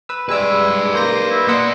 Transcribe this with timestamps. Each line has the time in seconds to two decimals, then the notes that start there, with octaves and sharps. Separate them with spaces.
0.09 B4 E6
0.29 G3 G#3 E4 B4 D5 E6
0.94 A#3 C6 G6 A#6
1.30 E4
1.48 A#3 D5 D#5 F#5 C6 E6